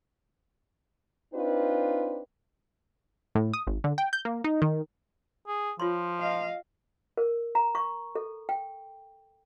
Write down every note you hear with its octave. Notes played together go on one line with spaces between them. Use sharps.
C4 D4 D#4 F4 B4
A2
D#6
G#1
D3
G5
G6
A#3
D#4
D#3
G#4
F3 F4 C#5 C6
D#5 F5
A#4
A#5
C#6
A4
G5